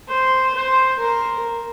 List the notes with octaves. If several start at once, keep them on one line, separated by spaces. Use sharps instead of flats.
C5
C5
A#4